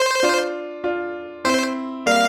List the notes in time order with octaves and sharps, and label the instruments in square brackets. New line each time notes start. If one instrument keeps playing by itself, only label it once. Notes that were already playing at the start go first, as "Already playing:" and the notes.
Already playing: [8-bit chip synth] C5
[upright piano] D4 F4
D4 F4
[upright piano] C4 E4 [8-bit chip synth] C5
[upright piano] G3 A#3 [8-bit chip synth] F5